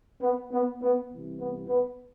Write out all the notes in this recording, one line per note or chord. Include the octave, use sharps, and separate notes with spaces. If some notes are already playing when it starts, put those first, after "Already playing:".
B3
B3
B3
C2 C3 E3
B3
B3